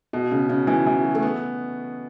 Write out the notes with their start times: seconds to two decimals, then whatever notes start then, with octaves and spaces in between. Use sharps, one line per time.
0.13 B2
0.31 C#3
0.49 C#3
0.67 E3
0.86 E3
1.04 F#3
1.15 A3
1.22 B3